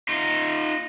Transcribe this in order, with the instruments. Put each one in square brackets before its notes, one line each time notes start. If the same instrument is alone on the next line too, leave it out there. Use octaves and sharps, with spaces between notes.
[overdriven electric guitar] D#4 F4